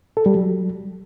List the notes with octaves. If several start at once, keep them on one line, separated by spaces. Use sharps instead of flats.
A4
G3
F#3